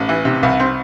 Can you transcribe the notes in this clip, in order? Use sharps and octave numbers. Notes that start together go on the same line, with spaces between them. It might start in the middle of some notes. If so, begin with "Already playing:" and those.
Already playing: A1
E3
C3
C2
C4